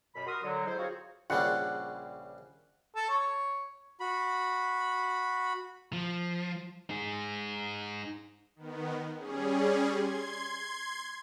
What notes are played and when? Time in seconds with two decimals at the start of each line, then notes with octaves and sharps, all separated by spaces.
0.15 F#2 B2 B5
0.26 F#4 A#4 C6 D#6
0.43 D3 F#3
0.66 G#3 D#4 E4 A4 C5
0.78 C4 F4 F#4 G#4 C#5
1.30 A#1 C#3 G3 F#5
2.95 A4
3.09 C#5
4.00 F#4 B5
5.93 F3
6.90 D#4 G#4
8.56 D#3 B3
9.17 G3 C#4 G#4
9.93 C6 G#6